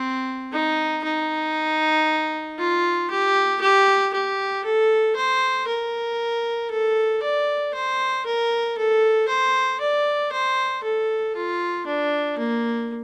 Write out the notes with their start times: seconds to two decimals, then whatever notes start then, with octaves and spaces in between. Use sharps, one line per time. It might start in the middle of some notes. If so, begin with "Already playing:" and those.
Already playing: C4
0.53 D#4
1.04 D#4
2.58 F4
3.10 G4
3.61 G4
4.13 G4
4.65 A4
5.16 C5
5.67 A#4
6.71 A4
7.23 D5
7.74 C5
8.26 A#4
8.78 A4
9.28 C5
9.80 D5
10.32 C5
10.83 A4
11.36 F4
11.86 D4
12.38 A#3